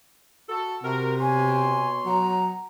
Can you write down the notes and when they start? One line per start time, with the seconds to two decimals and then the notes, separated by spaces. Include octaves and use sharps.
0.49 F#4 A4
0.84 C3 F#4 A#4
1.21 B2 C#5 G#5 C6
2.06 F#3 A#5